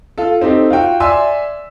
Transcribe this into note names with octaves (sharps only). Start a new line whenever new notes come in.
F4 A4
C4 D#4 G4 A4
F4 F#4 G5
D5 E5 G#5 C6 E6